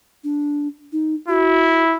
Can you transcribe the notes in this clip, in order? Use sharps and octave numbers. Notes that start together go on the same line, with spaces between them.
D4
D#4
E4 F#4